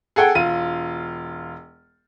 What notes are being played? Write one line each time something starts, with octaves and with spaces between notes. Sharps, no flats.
G#4 A4 F#5 G5
E1 F4 D#7